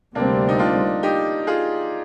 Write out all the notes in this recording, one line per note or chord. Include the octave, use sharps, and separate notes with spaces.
D2 C3 G3 A#3 C4 D4
D#4
D4 F4
D#4 G4
F4 G#4